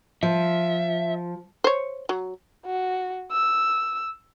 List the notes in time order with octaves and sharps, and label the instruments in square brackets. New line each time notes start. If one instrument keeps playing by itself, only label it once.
[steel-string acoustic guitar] F3 [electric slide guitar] E5
[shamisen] C5 C#5
F#3
[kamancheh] F#4
E6